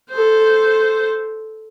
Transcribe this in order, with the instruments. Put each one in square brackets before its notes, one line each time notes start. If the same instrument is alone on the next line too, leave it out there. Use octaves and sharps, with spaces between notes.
[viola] A4 C5